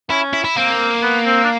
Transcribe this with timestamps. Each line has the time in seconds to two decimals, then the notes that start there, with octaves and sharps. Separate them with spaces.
0.10 C#4 E4
0.33 E4
0.45 E4
0.56 A#3 C4
1.02 B3
1.25 C4
1.44 D4